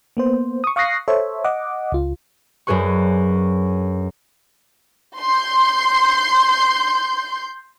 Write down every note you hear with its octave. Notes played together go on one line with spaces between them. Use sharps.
A#3 B3 C5
C#6 D#6
F5 C#6 D#6 F#6 A#6 C7
A4 C5 C#5 E5
D#5 F#5 D6
C#2 F4
F#2 D4 G#4 B4 C#6
C6 G6